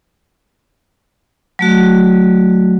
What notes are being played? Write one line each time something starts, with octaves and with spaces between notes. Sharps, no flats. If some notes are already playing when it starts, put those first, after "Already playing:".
F#3 A3 F#4